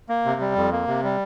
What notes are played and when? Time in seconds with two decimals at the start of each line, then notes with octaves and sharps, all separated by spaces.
0.09 A#3
0.25 C3
0.41 G3
0.56 F2
0.72 A#3
0.87 C3
1.03 G3